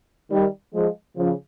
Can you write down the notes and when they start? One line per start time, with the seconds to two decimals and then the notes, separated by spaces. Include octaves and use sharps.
0.29 D#3 G3
0.73 F3 G#3
1.16 C#3 F3